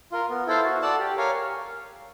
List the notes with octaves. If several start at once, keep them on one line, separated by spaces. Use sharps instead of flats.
F4 A#4
B3
E4 A4 C5 F5
F#4
A4 D5 F#5 A5
G4
A#4 C#5 F5 G#5